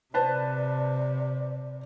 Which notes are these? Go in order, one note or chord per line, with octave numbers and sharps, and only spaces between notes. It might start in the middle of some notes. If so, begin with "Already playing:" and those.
C3 B4 C5 D5 A5